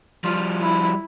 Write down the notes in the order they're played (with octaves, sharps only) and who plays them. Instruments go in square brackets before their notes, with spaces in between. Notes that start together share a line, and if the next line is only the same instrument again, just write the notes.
[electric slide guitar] F3 G3 [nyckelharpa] F4
[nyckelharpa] E4